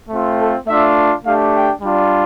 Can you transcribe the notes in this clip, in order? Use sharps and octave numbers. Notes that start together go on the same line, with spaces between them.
A3 C4 F4
A4
A3 D4 F4 E5
A3 D4 G4 F5
G5
G3 D4 F4